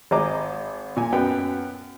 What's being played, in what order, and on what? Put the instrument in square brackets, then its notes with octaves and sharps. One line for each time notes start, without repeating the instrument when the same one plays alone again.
[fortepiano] G#1 G#3 C5 D#5 A#5 D6
A#2 G#5
F#2 B3 G5